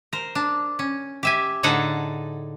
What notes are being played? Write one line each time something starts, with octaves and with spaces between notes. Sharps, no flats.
A#4 C5
D4
C#4
G4 E5 G#5
A2 D3 D#4 G#4 A4 F#5